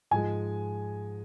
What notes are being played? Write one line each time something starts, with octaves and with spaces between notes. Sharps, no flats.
G#2 F3 G#3 G#5